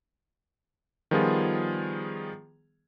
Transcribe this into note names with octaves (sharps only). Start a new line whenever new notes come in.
D#3 F3 G3 B3 F4 G#4